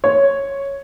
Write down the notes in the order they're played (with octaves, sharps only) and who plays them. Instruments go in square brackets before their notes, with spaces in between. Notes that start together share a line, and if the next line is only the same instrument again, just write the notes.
[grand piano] C#5